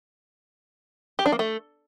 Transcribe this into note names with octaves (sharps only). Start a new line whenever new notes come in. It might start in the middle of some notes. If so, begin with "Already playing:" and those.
G4
D4
A#3
A3